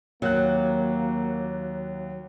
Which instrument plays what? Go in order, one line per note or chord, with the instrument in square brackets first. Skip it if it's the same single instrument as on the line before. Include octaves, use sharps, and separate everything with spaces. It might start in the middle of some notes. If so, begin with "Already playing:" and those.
[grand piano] D#2 F#6 [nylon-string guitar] F#3 [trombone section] A#3